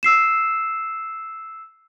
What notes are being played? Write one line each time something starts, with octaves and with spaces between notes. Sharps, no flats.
E6 C7 E7